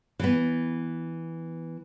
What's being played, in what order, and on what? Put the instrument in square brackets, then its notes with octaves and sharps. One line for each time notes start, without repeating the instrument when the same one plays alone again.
[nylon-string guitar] E3 B3